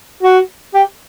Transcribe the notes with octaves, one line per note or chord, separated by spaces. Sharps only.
F#4
G4